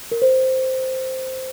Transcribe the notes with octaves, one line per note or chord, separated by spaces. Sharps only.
A#4
C5